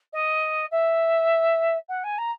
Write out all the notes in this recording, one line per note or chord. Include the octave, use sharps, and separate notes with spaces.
D#5
E5
F#5
G#5
A#5